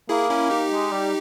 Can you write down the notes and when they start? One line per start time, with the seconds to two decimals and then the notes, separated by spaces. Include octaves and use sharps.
0.09 A#3 E4 G#4
0.30 C#4 E4
0.50 D#4 G4
0.71 G#3
0.91 G3